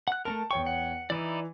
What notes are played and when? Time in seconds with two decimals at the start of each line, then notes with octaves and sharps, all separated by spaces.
0.08 F#5 F#6
0.25 A3 C4 A#4 A5
0.51 E2 C#5 G5 C#6
0.66 F#5
1.10 E3 D#4 E4 D5